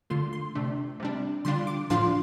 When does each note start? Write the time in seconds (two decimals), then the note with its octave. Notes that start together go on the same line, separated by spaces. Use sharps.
0.10 D3 A3 F4 C6
0.33 C6
0.55 C3 A3 D4
1.00 C3 G3 D4
1.45 D3 G3 D4 F4 C6
1.67 D6
1.90 A2 F3 D4 F4 C6